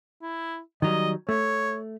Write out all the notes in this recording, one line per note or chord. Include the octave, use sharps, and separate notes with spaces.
E4
D#3 F#3 G3 D#5
A3 C#5